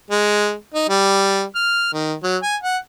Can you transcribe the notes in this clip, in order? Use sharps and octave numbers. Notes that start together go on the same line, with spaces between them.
G#3
D#4
G3
F6
D#3
F#3
G#5
F#5